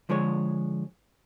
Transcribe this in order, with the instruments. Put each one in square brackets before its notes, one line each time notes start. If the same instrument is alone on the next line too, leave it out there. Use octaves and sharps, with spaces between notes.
[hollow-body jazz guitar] D3 F3 G#3 G#4 C#5